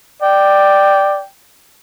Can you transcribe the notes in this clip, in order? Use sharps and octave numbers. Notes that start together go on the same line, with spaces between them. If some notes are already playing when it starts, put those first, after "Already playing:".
D5 G5